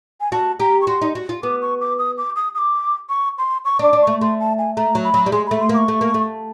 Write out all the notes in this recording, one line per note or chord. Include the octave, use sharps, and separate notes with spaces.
G#5
F#4 A5
G4 A#5
C#6
F#4 C6
D#4
F#4
F4
B3 D6
C#6
D6
D#6
D6
D#6
D#6
D6
C#6
C6
C#6
D4 D6
D4
A3 C#6
A3 C6
A5
G#5
A3 A#5
F#3
B5
F#3
G3
G#3 C6
A3 B5
C6
A#3 D6
C#6
A3
A#3
A3